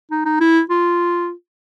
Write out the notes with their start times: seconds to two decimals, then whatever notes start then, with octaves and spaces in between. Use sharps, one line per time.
0.11 D#4
0.25 D#4
0.40 E4
0.70 F4